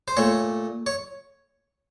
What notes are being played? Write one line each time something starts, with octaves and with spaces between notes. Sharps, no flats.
C5
A#2 A3 C#5
C#5